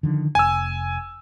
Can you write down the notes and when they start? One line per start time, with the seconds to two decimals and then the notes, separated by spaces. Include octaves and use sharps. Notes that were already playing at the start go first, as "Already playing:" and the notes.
0.03 D3 D#3 F3
0.35 F1 G#5 E6